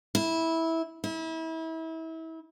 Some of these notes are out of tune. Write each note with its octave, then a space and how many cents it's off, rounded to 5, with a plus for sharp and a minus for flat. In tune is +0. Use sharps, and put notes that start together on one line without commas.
E4 -15
E4 -30